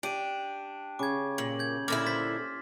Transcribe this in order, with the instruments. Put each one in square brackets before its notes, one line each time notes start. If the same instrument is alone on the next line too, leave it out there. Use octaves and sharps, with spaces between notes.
[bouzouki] D4 [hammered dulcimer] G4 [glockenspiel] D7 D#7
[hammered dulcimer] C#3 [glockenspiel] D6 G#6
[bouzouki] A#2 [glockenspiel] F#7
[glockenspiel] G6 G#6
[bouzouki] A#2 D3 E4 [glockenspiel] D6 F6 A6
[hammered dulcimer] C5 [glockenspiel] A6 B6